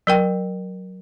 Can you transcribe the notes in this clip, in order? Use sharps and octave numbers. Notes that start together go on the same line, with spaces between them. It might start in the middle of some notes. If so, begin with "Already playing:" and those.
F#3 A#4 G5